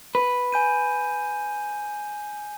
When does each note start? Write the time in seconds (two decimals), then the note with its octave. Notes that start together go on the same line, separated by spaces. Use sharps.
0.15 B4
0.52 G#5 G6 D#7